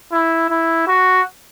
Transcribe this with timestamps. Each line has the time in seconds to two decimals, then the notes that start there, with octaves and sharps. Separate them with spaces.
0.12 E4
0.50 E4
0.88 F#4